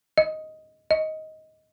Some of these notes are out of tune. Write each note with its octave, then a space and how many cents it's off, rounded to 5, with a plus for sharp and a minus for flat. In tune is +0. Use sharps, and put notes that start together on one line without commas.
D#5 +5
D#5 +15